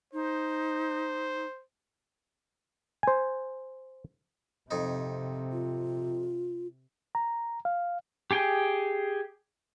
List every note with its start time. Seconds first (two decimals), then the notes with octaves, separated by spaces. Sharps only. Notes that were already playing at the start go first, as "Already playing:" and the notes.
0.13 D#4 C5
3.03 C5 G#5
4.71 F2 C3 D#4
5.52 F4
7.15 A#5
7.65 F5
8.31 G4 G#4 G5